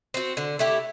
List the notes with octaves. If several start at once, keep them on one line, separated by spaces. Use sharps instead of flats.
C4 F#4
D3
A3 E4 G4